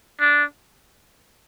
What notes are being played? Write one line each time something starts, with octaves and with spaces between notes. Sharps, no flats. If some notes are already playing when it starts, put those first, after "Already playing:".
D4